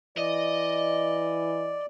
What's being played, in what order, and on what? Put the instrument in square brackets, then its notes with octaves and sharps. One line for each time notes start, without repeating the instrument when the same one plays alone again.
[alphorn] E3 [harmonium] D5 [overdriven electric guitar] D#5